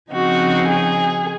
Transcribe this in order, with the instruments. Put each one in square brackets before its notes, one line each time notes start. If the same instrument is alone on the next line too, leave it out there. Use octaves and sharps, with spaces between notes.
[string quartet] C#3 F3 C4 D#4 F#4
G#4